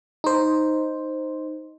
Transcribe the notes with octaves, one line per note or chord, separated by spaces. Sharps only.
D#4 C5